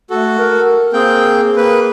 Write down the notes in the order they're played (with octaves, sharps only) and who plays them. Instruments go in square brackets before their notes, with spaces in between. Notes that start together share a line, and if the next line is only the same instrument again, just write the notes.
[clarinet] A3 [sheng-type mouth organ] F#4 A4
[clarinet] A#4
[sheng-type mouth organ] A#3 C4 G5 [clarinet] G#4
[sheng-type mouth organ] A#3 B4